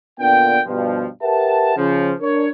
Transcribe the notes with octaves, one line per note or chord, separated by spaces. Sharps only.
A#2 D3 B3 D4 G5
G2 B2 F3
G4 A#4 B4 E5 F#5 A5
C#3 F3
D4 A#4 C#5